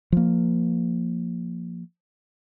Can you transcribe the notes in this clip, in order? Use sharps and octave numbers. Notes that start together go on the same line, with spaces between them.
F3 A#3